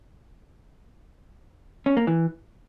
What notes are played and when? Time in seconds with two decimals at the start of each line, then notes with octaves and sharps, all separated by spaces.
1.86 C#4
1.97 A#3
2.07 E3